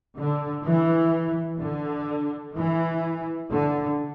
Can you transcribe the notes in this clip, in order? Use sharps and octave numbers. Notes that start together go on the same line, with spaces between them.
D3
E3
D3
E3
D3